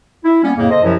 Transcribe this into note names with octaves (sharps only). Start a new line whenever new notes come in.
E4
G3 A#3 B3 C#4
F2 A2 C#3 A#3
A4 C5 D#5
F#2 C3 F3 F#3 E4